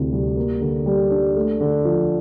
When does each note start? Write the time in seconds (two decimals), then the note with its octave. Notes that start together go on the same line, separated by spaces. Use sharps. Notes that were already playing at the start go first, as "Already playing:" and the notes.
Already playing: D2 C3 E3
0.12 G3
0.37 A#3
0.61 D3
0.86 G3
1.11 D4
1.36 A3
1.60 D3
1.85 F3